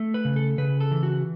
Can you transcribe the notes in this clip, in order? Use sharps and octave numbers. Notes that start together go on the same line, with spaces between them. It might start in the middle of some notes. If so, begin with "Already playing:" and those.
Already playing: A3
B4
C#3
A4
C#3 B4
A4
E3
F#4